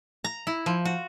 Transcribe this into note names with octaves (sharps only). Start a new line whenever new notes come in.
A#5
E4
F3
F#4